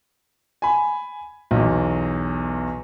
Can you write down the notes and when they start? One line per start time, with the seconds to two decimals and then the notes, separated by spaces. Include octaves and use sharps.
0.62 G#5 B5
1.51 B1 E2